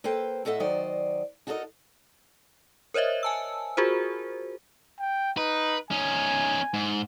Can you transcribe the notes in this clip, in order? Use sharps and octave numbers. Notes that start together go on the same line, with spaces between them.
A#3 A4 B4 C5 G5
A2 A4 D#5 E5 F#5
D#3 F#3 C5 D5 D#5
D#4 F#4 A4 A#4 C5 D#5
A#4 C5 C#5 D#5 E5
G#5 A5 E6
F4 F#4 G#4 A#4 C5
G5
D#4 B4
C#4 D#4 G#5
G#2